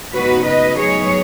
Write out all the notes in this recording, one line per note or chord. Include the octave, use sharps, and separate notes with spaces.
C#3 B3 D#4 F#4 B4
B4 D#5
F#3 B3 D#4 G#4 C#5